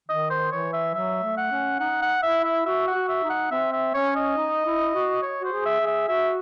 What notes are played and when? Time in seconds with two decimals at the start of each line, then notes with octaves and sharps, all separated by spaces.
0.08 D#3 D#5
0.30 C5
0.52 E3 C#5
0.73 E5
0.94 F#3 E5
1.23 A3
1.38 F#5
1.51 C#4
1.80 D#4 F#5
2.02 F#5
2.23 E4 E5
2.44 E5
2.66 F#4 E5
2.87 F#5
2.94 F#4
3.09 E5
3.23 D#4
3.30 F#5
3.51 C4 E5
3.73 E5
3.94 C#4 C#5
4.16 D#5
4.37 D#4
4.66 E4
4.94 F#4
5.23 C#5
5.41 F#4 C5
5.52 G#4
5.65 E5
5.80 G#4
5.87 E5
6.08 F#4 E5